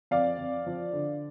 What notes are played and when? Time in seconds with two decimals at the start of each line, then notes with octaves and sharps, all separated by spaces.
0.11 F2 D5 F5
0.38 F2
0.66 F3
0.93 D3